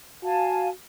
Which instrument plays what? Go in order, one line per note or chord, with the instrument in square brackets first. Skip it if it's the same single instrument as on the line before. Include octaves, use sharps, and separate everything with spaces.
[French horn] F#4 [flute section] F5 G#5 A5